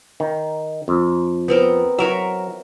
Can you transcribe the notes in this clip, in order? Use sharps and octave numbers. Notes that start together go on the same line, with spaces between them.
D#3
F2
B3 C4 A#4
F#3 F#4 A#4 E5